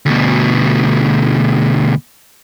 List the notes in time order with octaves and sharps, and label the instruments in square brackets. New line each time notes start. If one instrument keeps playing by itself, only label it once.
[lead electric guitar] D2 B2